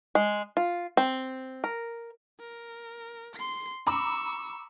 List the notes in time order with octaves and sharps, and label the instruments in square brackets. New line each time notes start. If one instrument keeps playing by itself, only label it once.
[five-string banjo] G#3
F4
C4
A#4
[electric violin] A#4
C6 C7
[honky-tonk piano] A#5 B5 D6 [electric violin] C#6 E6